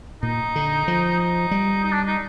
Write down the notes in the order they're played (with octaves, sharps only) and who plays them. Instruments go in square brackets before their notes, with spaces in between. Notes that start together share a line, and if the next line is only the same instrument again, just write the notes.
[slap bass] A#2 [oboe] D#4
[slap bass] D3
F3
[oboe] D#4
[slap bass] G3
[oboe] D#4
D4
D#4